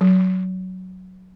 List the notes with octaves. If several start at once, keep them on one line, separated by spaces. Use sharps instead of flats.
F#3